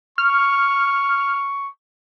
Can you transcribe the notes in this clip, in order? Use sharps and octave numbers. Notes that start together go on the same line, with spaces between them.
C#6 F6